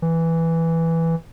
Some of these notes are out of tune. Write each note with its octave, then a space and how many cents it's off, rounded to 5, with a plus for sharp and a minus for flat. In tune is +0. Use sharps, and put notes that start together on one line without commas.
E3 +0